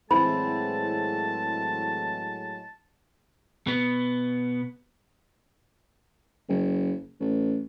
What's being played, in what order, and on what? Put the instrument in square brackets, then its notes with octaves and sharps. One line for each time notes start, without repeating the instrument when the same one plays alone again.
[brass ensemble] A2 F#3 G#3 [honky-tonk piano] E3 C4 [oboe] A5 [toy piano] B5
[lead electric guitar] B2 B3
[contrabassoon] F#1
A1